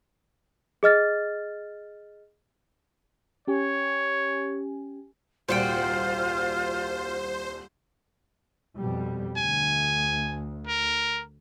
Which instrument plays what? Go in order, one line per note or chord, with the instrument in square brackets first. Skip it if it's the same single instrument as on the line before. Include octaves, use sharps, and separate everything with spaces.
[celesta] G#4 D#5 F6 A6
[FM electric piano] C#4 G4 G#5 [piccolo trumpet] C#5
[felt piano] D#1 C2 [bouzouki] A#2 F#4 G5 [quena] F4 [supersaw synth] C5
[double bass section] F2 B2 G3
[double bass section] D2 [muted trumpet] G#5
[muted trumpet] A#4